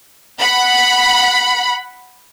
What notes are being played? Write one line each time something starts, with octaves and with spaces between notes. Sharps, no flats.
F#5 B5